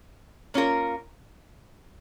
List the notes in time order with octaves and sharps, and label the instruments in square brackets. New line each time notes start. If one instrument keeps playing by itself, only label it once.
[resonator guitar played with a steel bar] A#3 C#4 F4 A#4